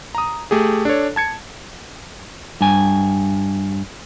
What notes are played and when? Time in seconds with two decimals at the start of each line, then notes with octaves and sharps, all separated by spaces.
0.15 A#5 D#6
0.51 A3 G4 G#4
0.85 D4 A4 C#5
1.16 A5 G#6 C#7
2.61 G2 G#5